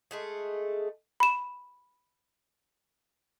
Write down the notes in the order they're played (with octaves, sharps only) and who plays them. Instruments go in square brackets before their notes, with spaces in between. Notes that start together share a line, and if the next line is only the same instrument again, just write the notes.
[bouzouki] G#3 A3 G#4
[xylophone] B5 E7